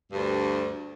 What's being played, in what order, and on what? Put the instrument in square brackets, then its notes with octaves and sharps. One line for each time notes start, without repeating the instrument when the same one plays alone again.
[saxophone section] D2 G2